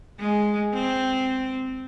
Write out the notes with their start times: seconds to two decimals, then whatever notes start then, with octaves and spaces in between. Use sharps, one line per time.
0.20 G#3
0.74 C4